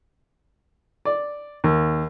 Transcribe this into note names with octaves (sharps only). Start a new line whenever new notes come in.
D5
D#2